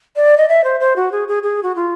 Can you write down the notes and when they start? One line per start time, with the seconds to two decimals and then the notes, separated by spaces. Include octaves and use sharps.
0.16 D5
0.38 D#5
0.49 E5
0.64 C5
0.80 C5
0.96 F#4
1.12 G#4
1.28 G#4
1.43 G#4
1.63 F#4
1.76 F4